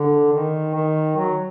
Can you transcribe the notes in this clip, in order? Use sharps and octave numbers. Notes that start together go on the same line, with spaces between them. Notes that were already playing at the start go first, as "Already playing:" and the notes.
Already playing: D3
D#3
D#3
F#3